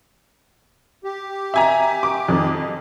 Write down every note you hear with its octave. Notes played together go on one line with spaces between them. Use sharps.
G4
E5 G#5 A#5
D6
F2 D#3